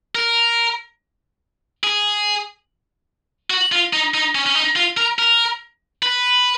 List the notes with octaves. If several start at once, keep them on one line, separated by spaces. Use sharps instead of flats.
A#4
G#4
F#4
F4
D#4
D#4
C#4
C#4
D#4
F4
A#4
A#4
B4